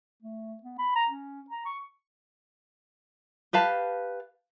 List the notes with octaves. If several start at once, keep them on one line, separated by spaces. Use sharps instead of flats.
A3
B3
B5
A#5
C#4
A#5
C#6
G4 B4 F5 A5